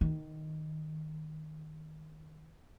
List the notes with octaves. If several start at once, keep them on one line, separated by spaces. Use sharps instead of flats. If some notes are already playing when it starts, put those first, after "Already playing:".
D#3